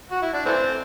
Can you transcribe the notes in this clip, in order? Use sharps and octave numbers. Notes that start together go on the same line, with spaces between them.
F#4
E4
D4
E3 A3 C4